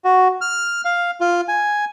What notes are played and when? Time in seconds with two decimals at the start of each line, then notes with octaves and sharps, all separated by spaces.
0.04 F#4
0.41 F6
0.85 F5
1.21 F4
1.48 G#5